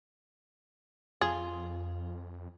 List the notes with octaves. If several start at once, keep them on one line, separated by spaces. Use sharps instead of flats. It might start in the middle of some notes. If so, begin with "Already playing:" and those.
F2 F4 G#4